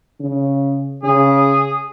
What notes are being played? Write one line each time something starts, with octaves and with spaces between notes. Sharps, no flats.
C#3
C#3 G#4